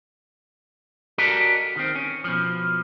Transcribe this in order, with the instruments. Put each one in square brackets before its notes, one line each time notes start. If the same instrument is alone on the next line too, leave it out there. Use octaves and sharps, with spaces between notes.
[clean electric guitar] F#4 G4 A4 A#4 D5 D#5
D#3 C4
C#4
B2 F3